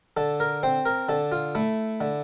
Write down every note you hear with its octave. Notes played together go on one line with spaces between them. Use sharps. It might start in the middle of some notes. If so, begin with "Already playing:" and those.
D3 A4
A#4
C4 C5
A#4
D3 A4
F4
A3 E4
D3